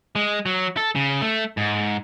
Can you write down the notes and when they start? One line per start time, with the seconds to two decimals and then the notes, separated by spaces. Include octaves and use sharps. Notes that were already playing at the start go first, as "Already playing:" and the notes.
0.16 G#3
0.46 F#3
0.77 A4
0.95 C#3
1.21 A3
1.57 G#2